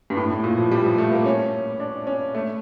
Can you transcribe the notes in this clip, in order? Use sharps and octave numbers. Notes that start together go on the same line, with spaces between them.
G2
A2
A2
A#2
F3
G3
F3
A3
A#3
C#4
D4
C#4
A3